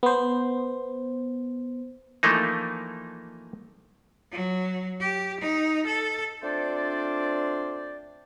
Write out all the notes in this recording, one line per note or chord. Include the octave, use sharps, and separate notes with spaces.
B3 C5
E3 F3 A3 A#3 D#4
F#3
G4
D#4
A4
A3 C4 D4 F4 C5 D5